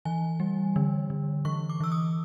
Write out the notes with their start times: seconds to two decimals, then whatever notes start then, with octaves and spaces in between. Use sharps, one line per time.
0.05 E3 G#5
0.40 G3
0.76 D3
1.10 D3
1.45 E3 C#6
1.69 D6
1.80 E3 E6
1.92 D#6